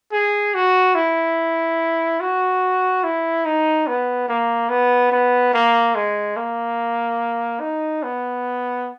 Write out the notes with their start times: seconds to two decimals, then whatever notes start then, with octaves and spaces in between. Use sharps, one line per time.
0.12 G#4
0.54 F#4
0.95 E4
2.20 F#4
3.04 E4
3.45 D#4
3.87 B3
4.28 A#3
4.69 B3
5.12 B3
5.54 A#3
5.95 G#3
6.37 A#3
7.60 D#4
8.03 B3